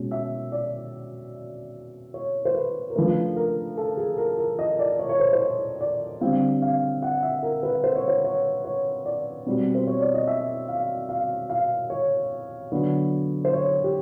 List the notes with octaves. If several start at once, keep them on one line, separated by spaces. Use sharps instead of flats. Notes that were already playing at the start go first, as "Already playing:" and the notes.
Already playing: B2 G#3 C#4
E5
D5
C#5
C5
B4
A#4
C#3 F3 A3 D4 B4
A#4
A4
G#4
A#4
A#4
D#5
D5
C#5
C#5
C5
C5
C#5
D5
D3 G3 C4 F5
F5
F#5
E5
A#4
B4
C5
C#5
C5
C#5
C#5
D5
B2 G3 C4
C5
C#5
D5
D#5
E5
F5
F5
F5
C#5
D3 F#3 B3
C5
C#5
G4